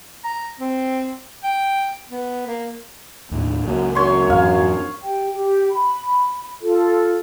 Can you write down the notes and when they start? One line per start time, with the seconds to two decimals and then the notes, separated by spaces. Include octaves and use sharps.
0.24 A#5
0.60 C4
1.44 G5
2.10 B3
2.47 A#3
3.31 D#2 A2
3.66 C#2 F#2 F#3 A#3
3.95 F#2 C#5 C6
4.30 F2 G#2 E3 F5
5.04 G4 G5
5.34 G4
5.70 B5
6.62 F4 A4